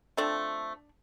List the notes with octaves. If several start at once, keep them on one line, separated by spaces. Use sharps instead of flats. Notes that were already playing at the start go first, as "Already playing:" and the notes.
F3 A3 C4 D4